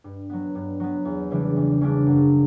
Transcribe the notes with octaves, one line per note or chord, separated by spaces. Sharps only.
G2
F#3 B3
G2
F#3 B3
E2
C#3 E3 G3 D4
E2
C#3 E3 G3 D4
F#2